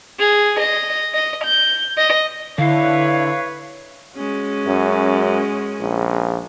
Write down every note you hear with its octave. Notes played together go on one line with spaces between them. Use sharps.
G#4
D#5
D#5
G6
D#5
D3 E4 B4 C#5 F5
G#3 C#4 F#4
F#2
A#1